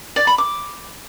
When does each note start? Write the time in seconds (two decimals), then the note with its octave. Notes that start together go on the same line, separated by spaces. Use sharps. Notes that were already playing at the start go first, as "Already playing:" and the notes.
0.16 D5
0.27 B5
0.38 D6